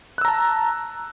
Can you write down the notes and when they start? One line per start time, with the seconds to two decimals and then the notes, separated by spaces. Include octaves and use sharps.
0.18 F#6
0.21 E6
0.25 A#5
0.28 A5